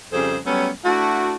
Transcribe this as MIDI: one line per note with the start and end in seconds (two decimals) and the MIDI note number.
0.13 0.37 41
0.13 0.37 49
0.13 0.37 55
0.13 0.37 68
0.13 0.37 69
0.13 0.37 72
0.46 0.69 54
0.46 0.69 55
0.46 0.69 57
0.46 0.69 59
0.46 0.69 61
0.84 1.35 57
0.84 1.35 62
0.84 1.35 64
0.84 1.35 66